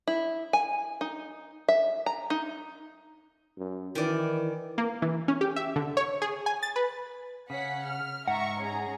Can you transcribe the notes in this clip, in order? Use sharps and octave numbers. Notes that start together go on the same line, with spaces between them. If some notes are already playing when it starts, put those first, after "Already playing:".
E4
G#5
D#4
E5
A#5
D#4
F#2
D#3 E3 D5
A#3
E3
C#4
G4
E5
D3
C#5
G#4
G#5
A6
B4
C#3 C#4 F#5 B6
F6
G#2 E5 F#5 A#5 C#6
C#4 G#4 A#5